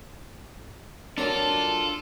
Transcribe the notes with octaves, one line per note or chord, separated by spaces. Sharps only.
F#3 D4 F4 A4 A#4 A5 A#5